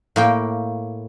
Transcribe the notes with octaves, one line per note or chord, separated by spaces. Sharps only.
A2 A#3 G5